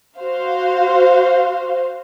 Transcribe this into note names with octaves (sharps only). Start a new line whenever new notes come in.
F#4 C5 F5